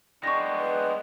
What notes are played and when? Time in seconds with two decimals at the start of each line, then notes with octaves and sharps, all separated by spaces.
0.24 G#3 B3 D4 G5 C#6 A#6
0.60 B4